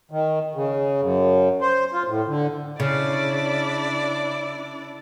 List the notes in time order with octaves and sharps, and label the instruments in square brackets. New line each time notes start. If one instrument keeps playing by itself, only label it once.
[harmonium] D#3
C#3
F#2
C5
F4
A2
D3
[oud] C#3 [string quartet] D4 E4 D5